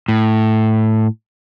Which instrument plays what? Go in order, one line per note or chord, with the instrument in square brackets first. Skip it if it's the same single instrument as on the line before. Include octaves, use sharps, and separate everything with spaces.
[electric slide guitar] A2